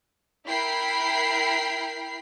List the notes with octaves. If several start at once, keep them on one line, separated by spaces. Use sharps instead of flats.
E4 A#4 G5 B5 C7